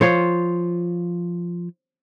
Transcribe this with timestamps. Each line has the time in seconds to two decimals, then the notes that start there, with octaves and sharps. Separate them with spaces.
0.01 F3 F4 C5 C#5